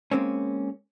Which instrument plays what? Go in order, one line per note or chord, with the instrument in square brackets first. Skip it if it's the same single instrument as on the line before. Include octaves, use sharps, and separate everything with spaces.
[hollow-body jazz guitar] G#3 A#3 C4 C#4